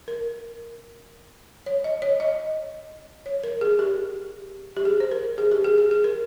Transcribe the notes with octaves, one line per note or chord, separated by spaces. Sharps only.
A#4
C#5
D#5
C#5
D#5
C#5
A#4
G#4
G4
G4
G#4
C5
A#4
G#4
G4
G#4
G#4
G#4
A#4